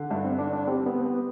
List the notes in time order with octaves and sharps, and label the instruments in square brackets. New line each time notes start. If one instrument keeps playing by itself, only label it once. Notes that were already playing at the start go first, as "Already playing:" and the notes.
Already playing: [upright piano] D3
[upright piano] G2 [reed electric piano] D4
[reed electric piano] C4
[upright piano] D3 [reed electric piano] D4
[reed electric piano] D4
[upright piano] G3 [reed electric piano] C4
[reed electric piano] B3
[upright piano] C4
[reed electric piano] B3